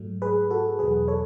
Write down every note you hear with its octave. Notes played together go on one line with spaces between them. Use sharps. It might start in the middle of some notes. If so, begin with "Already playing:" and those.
Already playing: G#2 F#3 A3
G#4 B4
F#4 A4
E2 B2 F#3 G#4 B4
A4 C#5